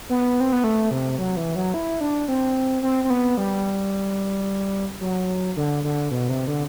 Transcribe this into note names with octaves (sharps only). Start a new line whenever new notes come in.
B3
C4
B3
A3
C3
F#3
E3
F#3
E4
D4
C4
C4
C4
B3
G3
F#3
D3
D3
B2
C3
D3